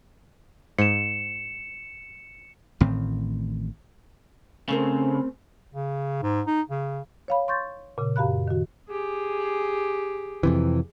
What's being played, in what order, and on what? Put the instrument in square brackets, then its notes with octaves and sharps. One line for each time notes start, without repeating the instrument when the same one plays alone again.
[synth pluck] G#2 [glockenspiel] C#7 E7
[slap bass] A1 A2 D#3 C4
[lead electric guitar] C#3 [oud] A3 C4 A#4
[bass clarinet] C#3
G#2
D#4
C#3
[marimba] C#5 F5 B5
C6 C#6 G6 A6
A#2 C#3
F#2 G4 F5 B5 F#6
D#3 F#4
[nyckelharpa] G4 G#4
[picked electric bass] F2 C3 E3